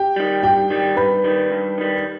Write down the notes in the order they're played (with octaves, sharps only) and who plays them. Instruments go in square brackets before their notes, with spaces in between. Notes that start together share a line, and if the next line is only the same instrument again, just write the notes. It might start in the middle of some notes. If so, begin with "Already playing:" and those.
Already playing: [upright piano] G4 G5
[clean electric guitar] D#3 G3
[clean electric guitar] G2 [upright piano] G4 G5
[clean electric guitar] D#3 G3
[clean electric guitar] G2 [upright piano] B4 B5
[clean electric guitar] D#3 G3
G2
D#3 G3